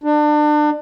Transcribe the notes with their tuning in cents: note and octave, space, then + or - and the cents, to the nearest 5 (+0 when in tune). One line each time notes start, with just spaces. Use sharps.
D4 +30